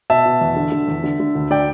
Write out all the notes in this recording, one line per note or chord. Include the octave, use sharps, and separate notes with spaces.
B2 E5 A5
B2
E2
D3
D3
E2
D3
D3
D2
D3 D5 G5